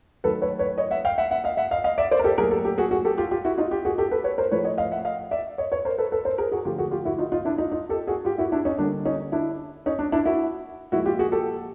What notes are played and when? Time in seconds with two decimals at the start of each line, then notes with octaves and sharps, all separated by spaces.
0.24 D#3 F#3 A3 A4 B4
0.42 B4 C#5
0.59 B4 C#5
0.78 C#5 D#5
0.91 E5 F#5
1.05 F5 G5
1.18 E5 F#5
1.31 E5 F#5
1.44 D#5 F5
1.57 E5 F#5
1.71 D#5 F5
1.84 D#5 F5
1.98 D5 E5
2.11 C5 D5
2.19 A#4
2.24 G4 A4
2.38 A#2 F#3 A3 G#4 A#4
2.51 G4 A4
2.64 G4 A4
2.78 F#4 G#4
2.91 F#4 G#4
3.05 G4 A4
3.18 F4 G4
3.31 F4 G4
3.45 E4 F#4
3.58 D#4 F4
3.71 F4 G4
3.85 F#4 G#4
3.98 G4 A4
4.11 A4 B4
4.24 B4 C#5
4.38 A#4 C5
4.51 A2 F3 A3 B4 C#5
4.64 C#5 D#5
4.78 D#5 F5
4.91 E5 F#5
5.05 D#5 F5
5.31 D5 E5
5.58 C#5 D#5
5.72 B4 C#5
5.85 A#4 C5
5.98 A4 B4
6.12 A4 B4
6.25 A#4 C5
6.38 G#4 A#4
6.52 F#4 G#4
6.65 D3 F3 A3 F4 G4
6.78 F#4 G#4
6.91 F4 G4
7.05 E4 F#4
7.18 D#4 F4
7.32 D#4 F4
7.45 D4 E4
7.58 D#4 F4
7.71 D#4 F4
7.89 G4 A4
8.07 F#4 G#4
8.25 F4 G4
8.38 E4 F#4
8.52 D4 E4
8.65 C#4 D#4
8.78 D3 G3 A#3 D4
9.05 C#4 D#4
9.32 D4 E4
9.86 C#4 D#4
9.99 D4
10.12 D4 E4
10.25 E4 F#4
10.92 A#2 F3 G#3 E4 F#4
11.06 F4 G4
11.19 F#4 G#4
11.32 G4 A4